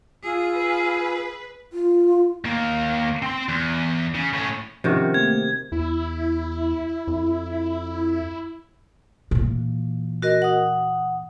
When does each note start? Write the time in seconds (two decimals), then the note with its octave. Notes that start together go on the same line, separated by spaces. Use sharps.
0.24 F4 G#4 G#5 E6
0.54 B4
1.73 F4
2.45 D#2 A#3
3.22 C4 C6
3.49 E2
4.15 C#3
4.34 A2 C#4
4.84 C3 D#3 F3 C#4 F#4 C5
5.14 A3 A#3 C4 G#6
5.72 E2 E4
7.07 F2
9.31 A#2 E3
10.22 F#4 A#4 D#5
10.42 F#5 D#6